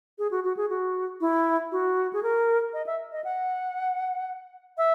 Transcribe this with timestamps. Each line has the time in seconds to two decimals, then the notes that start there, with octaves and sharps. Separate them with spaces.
0.19 G#4
0.31 F#4
0.44 F#4
0.57 G#4
0.70 F#4
1.21 E4
1.72 F#4
2.13 G#4
2.23 A#4
2.73 D#5
2.86 E5
3.12 D#5
3.25 F#5
4.78 E5